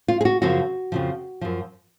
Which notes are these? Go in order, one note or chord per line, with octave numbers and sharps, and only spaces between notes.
F4
G#4
F#4
F#2 C#3 F3 F#4
F2 C#3 F3
F#2 F3